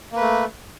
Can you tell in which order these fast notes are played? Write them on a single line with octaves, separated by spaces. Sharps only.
A#3 B4 A3